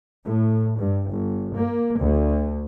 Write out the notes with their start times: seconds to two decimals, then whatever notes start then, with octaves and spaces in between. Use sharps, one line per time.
0.24 A2
0.77 G2
1.11 G1
1.54 A#3
1.99 D2